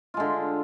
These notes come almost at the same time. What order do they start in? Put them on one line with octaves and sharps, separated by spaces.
F4 G#3 D3